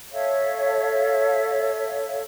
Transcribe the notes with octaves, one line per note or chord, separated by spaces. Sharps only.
A4 C#5 E5 F5